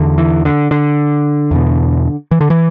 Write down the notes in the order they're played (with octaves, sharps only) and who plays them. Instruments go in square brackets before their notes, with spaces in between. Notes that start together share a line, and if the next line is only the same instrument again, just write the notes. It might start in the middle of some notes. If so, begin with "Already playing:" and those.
Already playing: [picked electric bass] E2 D3
E3
D3
D3
E2 B2
E3
D3
E3